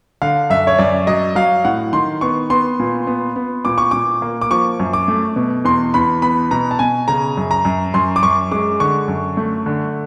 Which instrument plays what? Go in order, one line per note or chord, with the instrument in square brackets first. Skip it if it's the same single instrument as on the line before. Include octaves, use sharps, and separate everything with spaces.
[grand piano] D3 F5
F#2 E5
C#5
F#2 D5
F#3 D#5
F#3 F5
A2 F#5
D#3 C6
B3 C#6
B3 C6
A#2
B3
B3
A#2 D6
C#6
A#2 D6
A#3
D6
F3 C#6
F#2
D6
A3
B2
E2 C6
E2 B5
B3 B5
B2 A#5
A5
B2 G#5
C#3 A#5
F#2
A#5
F#2
F#2 C6
D6
F#2 C#6
G#3 D6
D3 C#6
F#2
A3
D3